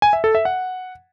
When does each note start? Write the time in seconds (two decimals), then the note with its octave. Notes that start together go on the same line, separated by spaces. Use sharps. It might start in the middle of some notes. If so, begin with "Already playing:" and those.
0.02 G#5
0.13 E5
0.24 A4
0.35 E5
0.45 F#5